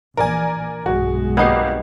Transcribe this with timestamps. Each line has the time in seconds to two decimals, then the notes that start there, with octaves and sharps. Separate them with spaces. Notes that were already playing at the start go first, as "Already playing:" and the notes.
0.17 A#1 A#2 E3 A#4 D5 G#5
0.86 B1 G2 G#3 F#4
1.37 G#1 A#3 B3 D#4 G4 C7